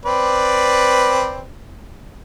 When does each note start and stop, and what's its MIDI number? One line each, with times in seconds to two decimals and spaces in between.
0.06 1.44 60
0.06 1.44 71
0.06 1.44 74